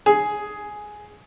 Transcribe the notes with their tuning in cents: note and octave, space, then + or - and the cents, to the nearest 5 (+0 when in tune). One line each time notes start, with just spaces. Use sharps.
G#4 +10